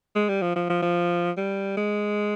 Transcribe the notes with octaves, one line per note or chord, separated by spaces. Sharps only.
G#3
G3
F3
F3
F3
F3
G3
G#3